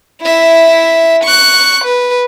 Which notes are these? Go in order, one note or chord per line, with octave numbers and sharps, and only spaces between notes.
E4 E5
C#6 F#6
B4